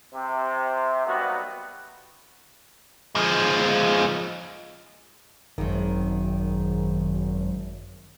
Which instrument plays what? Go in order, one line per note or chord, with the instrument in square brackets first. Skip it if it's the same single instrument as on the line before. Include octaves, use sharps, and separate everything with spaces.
[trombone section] C3
F#3 G3 A#3 B3 D#4 F#4
[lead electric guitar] F3 G#3
[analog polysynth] G#1 [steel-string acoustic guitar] F#2 D#3